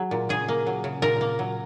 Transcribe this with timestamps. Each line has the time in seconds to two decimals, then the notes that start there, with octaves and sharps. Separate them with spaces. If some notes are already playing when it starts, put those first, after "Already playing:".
Already playing: F#3 G#4
0.11 A#2
0.29 C#3 G#4
0.48 A#3
0.67 F#3
0.84 C#3
1.02 A#2 A#4
1.21 A#3
1.39 F#3